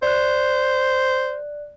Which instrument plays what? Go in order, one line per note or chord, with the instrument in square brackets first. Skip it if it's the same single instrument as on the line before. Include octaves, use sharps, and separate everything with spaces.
[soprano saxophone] C5 [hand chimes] D5 F#6